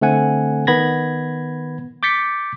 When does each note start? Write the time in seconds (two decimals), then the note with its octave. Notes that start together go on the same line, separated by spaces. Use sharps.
0.01 D3 A3 C4 F#5 G#5
0.67 D#3 B3 B5 G#6 A#6
2.03 D6 G6 A6 B6 C#7